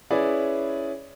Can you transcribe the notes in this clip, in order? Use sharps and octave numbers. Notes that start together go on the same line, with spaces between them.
C#4 E4 G#4 B4 D5